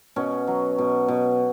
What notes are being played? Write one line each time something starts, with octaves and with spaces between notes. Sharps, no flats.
B2 C#4
F#3
B2
B2